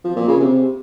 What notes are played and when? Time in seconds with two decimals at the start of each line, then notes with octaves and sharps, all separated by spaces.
0.05 F3
0.16 A#2
0.28 C#3
0.40 C3